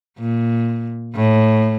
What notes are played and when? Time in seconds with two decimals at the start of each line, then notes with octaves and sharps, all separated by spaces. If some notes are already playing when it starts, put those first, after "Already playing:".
0.19 A#2
1.15 A2